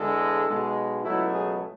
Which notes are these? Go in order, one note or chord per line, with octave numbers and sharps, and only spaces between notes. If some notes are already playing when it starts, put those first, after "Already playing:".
Already playing: E2 D3 G#3 A4
B1 B2 G#3
C#2 B2 F#3 A3 E4
G#4